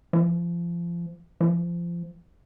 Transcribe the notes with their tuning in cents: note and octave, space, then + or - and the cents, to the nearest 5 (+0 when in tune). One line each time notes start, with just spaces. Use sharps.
F3 -30
F3 -25